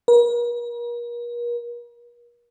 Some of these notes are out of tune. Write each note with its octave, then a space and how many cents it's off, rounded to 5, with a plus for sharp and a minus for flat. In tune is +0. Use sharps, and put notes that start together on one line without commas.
A#4 +40